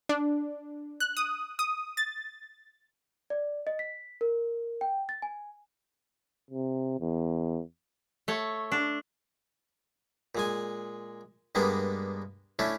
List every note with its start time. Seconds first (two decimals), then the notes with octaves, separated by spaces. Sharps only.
0.09 D4
1.00 F#6
1.17 D#6
1.59 D#6
1.97 A6
3.30 D5
3.67 D#5
3.79 B6
4.21 A#4
4.81 G5
5.09 A6
5.22 G#5
6.51 C3
7.00 E2
8.28 A3 C#5
8.72 D4
10.35 A#2 G#3 G#5
11.55 G2 G#3 A#3 B3 D4
12.59 A3 C#4 D4 E4